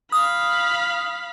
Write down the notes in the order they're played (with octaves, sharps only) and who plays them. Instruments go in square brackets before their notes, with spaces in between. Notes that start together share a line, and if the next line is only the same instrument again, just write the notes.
[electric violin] F5 B5 [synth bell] D#6